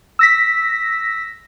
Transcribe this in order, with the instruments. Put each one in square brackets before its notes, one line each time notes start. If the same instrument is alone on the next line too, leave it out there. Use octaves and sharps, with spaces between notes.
[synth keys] E6 A#6 B6